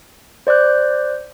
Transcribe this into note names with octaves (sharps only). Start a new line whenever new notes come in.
C5 D5 D6 F#6 G6